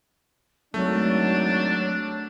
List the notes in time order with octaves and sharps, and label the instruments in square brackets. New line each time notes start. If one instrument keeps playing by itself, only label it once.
[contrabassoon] G#1 [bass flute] F#3 [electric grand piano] A3 [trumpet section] D4